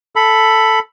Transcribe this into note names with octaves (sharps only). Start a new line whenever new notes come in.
A4 B5